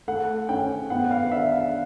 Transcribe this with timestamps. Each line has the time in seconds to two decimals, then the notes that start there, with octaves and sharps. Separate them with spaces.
0.08 A3 F#5
0.49 C#4 G5
0.90 B3 F#5
1.11 F5
1.31 D4 E5
1.52 F5